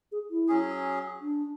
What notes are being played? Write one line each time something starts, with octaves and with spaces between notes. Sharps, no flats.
G#4
E4
F#3 C#4 G#4
D4